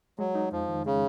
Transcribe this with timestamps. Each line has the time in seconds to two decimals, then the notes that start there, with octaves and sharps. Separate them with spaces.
0.19 F#3 G#3
0.35 D#4
0.52 F2 F3
0.69 D#3
0.86 C#3 G#3